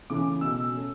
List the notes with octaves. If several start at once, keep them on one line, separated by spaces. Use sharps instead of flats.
C#3 E3 A3 C#4 D6
B2 E6
A3 C#4